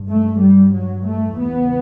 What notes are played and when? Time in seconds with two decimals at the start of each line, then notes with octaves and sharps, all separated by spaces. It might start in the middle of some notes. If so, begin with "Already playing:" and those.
Already playing: G2
0.09 A3
0.41 G3
0.74 F#3
1.06 A3
1.39 E2 C#3 B3